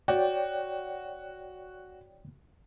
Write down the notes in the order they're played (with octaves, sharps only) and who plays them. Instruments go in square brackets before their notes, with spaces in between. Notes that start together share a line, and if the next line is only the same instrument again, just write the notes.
[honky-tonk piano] F#4 [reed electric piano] C#5 D5 G5